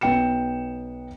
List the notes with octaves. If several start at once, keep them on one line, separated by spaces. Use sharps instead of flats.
B1 B3 G5 C#7 E7